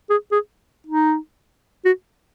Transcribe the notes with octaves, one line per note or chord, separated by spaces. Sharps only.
G#4
G#4
D#4
F#4